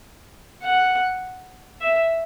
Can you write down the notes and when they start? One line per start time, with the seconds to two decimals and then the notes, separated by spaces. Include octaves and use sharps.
0.63 F#5
1.81 E5